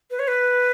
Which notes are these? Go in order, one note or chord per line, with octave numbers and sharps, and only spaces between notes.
B4
C#5
B4